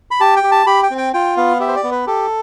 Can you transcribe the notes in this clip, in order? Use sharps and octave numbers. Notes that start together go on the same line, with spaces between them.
B5
G4 A5
G5
G4
A5
G4 B5
G5
C4
G5
F4 G5
B3 F5
G4 E5
C5
D5
B3
B4
G4 A4